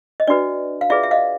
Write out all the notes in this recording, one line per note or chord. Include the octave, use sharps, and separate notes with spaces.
D#5
D4 F#4 B4 D5
F5
F4 G#4 B4 D5 E5
E5
D#5 F5